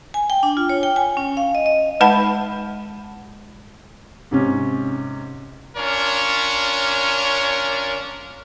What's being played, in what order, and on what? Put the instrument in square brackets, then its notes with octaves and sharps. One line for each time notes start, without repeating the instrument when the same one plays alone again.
[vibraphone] G#5
G5
D4
F4
C#5
G5
G#5
C#4
F5
D#5
D#5
[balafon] G#3 D#4 B4 F#5 A5 B5
[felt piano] G#2 C3 C#4
[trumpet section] C#4 D4 F4 A#4 C#5